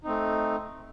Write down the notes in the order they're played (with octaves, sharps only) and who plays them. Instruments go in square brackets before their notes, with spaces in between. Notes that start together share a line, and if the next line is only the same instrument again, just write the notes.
[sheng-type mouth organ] A3 C4 D#4